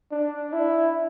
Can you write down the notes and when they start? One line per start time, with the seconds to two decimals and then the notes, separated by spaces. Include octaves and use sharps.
0.11 D4
0.53 E4